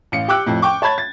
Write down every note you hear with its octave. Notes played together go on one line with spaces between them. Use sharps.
A1 F5 C#7
G4 G5 D6 E6 F#6
F2 A2
G5 C#6 D6
C#5 A5 B5 G#6 A6
A6